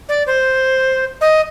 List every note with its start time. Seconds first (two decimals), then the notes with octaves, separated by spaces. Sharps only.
0.09 D5
0.27 C5
1.21 D#5